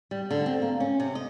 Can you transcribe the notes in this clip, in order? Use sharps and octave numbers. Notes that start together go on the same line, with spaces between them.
G3
D3
C4
A#3
C#4
C3
D#5